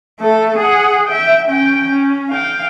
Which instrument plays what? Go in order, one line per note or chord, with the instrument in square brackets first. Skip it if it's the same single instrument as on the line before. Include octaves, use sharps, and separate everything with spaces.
[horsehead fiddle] A3 A4
G#4 F#5
E5 G5
C#4 G5
C#4
F5 G5